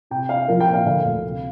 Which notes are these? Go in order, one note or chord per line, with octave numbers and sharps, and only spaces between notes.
C3 G5
D4 F5
F3 A#4
G5
A#2
F5
D3 F5
D2
C3